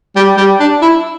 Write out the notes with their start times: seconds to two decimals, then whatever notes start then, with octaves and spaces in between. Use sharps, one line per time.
0.16 G3
0.37 G3
0.60 D4
0.82 E4